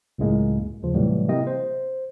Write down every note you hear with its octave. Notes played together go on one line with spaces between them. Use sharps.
C#2 F#2 A2 G#3 A#3
D#2 C#3 F3
A2 C3 E3 F#3 G3 A3
C3 A#3 E4 D#5 G5
C5